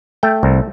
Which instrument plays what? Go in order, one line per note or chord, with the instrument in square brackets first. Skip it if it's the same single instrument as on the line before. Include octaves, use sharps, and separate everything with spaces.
[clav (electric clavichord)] A3 G5
C2